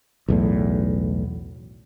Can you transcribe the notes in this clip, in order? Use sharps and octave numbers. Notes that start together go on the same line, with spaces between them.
B1 E2 A2